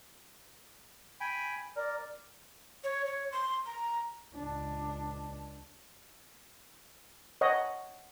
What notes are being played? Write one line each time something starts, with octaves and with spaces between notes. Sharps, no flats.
G5 G#5 B5
A#4 D5
C#5
C#5
C6
A#5
C#2 D4
C#5 D#5 F#5